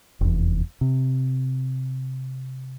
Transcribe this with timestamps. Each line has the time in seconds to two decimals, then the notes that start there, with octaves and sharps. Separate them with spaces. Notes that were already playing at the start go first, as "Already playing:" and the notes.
0.21 F1 E2
0.81 C3